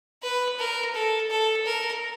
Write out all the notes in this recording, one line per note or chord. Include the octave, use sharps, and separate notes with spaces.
B4
A#4
A4
A4
A#4